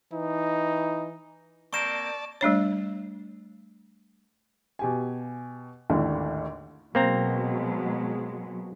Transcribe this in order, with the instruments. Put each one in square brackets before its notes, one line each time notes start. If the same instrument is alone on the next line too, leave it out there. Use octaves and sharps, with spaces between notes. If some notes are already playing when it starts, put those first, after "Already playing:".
[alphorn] E3 [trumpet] D#4
[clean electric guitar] A#3 C4 A#4 [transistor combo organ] D5 A5 [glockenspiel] C#6 E7
[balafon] G3 A3 D4 C#5
[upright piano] B2 G4 G#5
G#1 D#2 A2 D3
[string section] B2 F#3 G#3 [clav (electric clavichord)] A#3 C4 A#5